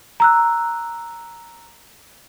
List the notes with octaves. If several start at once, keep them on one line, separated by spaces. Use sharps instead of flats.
A#5 E6 F#6